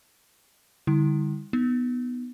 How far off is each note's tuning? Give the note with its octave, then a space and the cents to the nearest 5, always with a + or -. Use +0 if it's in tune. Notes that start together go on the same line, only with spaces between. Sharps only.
D3 +0 G3 +35 E4 -30
B3 +0 D#4 +0